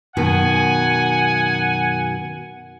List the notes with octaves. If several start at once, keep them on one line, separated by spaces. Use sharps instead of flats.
F#2 B2 D#3 F#5 G#5